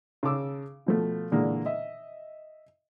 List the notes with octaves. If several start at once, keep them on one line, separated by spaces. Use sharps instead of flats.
C#3 A5 D6 E6
B2 F3 A3
A#2 D3 E3 G#3 A#3
D#5 E5